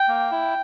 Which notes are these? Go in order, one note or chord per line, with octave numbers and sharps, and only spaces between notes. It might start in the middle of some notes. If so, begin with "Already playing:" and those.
Already playing: G5
A#3
E4